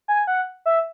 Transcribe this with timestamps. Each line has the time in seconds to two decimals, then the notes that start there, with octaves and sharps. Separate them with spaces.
0.08 G#5
0.27 F#5
0.66 E5